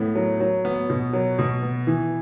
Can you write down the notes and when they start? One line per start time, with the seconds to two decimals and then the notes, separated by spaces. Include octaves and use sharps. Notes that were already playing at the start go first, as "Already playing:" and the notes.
Already playing: A2 B3
0.15 F#3
0.40 F#3
0.65 B3
0.90 B2
1.13 F#3
1.39 B2
1.62 B3
1.87 E3